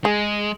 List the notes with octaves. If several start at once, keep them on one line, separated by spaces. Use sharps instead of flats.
G#3 G#4